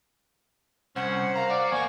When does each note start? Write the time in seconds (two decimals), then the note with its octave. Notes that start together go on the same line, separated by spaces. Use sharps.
0.96 C2 C#4 C5 F#5
1.36 A#4 F5 A#5
1.50 F#4 D5
1.71 E2 A#3 G#5 C#6